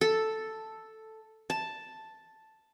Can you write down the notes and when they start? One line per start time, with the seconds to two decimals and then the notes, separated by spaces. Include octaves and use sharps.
0.01 A4
1.50 A5